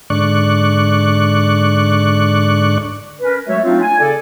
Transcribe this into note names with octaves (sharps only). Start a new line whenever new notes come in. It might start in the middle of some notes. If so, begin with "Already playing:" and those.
G#2 D3 D5 C#6 F#6
C#4 A#4 B4
F#3 G#3 A3 F#4 C#5 E5
F#3 A3 C4 D4 D#4 F4
G#5
C#3 A4 D5